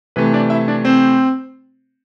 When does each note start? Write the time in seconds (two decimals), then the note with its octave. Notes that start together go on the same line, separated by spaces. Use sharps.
0.16 C3 E3 A3 B4
0.33 D4 D5
0.50 E4 E5
0.68 D4 D5
0.85 C4 C5